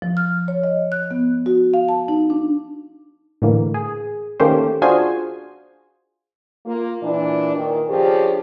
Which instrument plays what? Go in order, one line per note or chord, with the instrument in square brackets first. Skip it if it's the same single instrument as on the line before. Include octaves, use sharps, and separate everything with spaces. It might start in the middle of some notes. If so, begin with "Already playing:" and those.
[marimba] F3
F6
C#5
D#5
F#6
B3
F#4
F5
A5
D#4
D4
[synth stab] A2 D3 E3 A#3
G#4
D#3 A3 A#3 C#4 G4 C5
D4 F4 F#4 G#4 C5 G#5
[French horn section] A#3 F4
A#2 E3 D4
A#2 D#3
C#3 F3 D4 G4